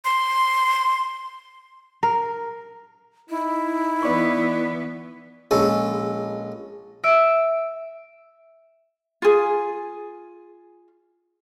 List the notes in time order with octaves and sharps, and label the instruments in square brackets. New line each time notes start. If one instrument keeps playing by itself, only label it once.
[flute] C6
[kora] A#4
[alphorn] D#4 [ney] E4
[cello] E3 B3 [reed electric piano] B4 D5 C#6
[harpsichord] A#1 G#3 C#4 A4 A5
[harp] E5 E6 D7
[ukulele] F4 G#4